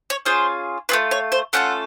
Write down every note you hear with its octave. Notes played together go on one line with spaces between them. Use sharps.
C#5
C#4 F4 G#4 C5
A3 C4 F4 B4
C#5
C5
A3 C#4 F4 A4 F#5